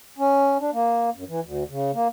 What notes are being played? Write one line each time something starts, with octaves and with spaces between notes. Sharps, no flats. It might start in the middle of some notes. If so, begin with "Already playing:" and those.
C#4
D4
A#3
F#2
E3
D2
C#3
A#3